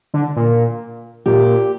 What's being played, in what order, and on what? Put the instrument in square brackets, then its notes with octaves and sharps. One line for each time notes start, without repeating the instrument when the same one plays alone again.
[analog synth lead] D3
A#2
[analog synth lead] A#2 [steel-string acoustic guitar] G4